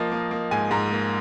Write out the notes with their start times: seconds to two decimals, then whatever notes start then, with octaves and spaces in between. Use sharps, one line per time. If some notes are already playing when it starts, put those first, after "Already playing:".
Already playing: F3 A#3 D#5
0.12 A#3
0.31 A#3
0.51 G#2 G#5
0.71 G#2 A#5
0.92 A#3